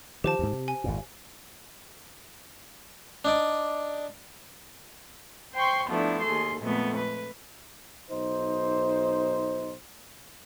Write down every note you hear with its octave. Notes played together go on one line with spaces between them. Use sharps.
D#3 F3 G4 C5 A5
D2 G#2
C3
G#5
G#1 F2 A#2
D4 D#4 D5
C5 G5 C6 C#6 G6
F3 A3 B3 D4 E4
D#2 G#4 A4 C6
F2 A#2 G#3 A3 B3
B4
B1 D#4 C5